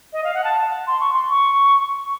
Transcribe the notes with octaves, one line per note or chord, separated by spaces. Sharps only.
D#5
F5
F#5
A5
C6
C#6
C6
C#6